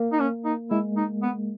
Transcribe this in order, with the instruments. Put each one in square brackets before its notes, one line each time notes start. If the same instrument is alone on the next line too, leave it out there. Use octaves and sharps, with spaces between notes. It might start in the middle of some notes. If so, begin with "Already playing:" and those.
Already playing: [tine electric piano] A#3
[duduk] D#4
C#4
D#4
[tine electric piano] G#3 [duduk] E4
[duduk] D#4
B3